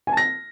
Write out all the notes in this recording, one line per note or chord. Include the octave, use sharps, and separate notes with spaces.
G#5
A5
A#6